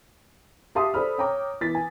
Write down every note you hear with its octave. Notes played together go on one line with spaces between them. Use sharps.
G4 E5 F5 A5 C6 D#6
A4 C5 D5 B5 F6
C#5 G5 A#5 D6
E3 B3 A6 B6
G#5